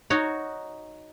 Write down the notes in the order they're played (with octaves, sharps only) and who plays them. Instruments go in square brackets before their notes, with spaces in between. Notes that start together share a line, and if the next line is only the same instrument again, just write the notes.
[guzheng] D#4 F#4 C#5